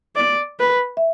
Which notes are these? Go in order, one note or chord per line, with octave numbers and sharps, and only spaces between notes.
D5
B4
E5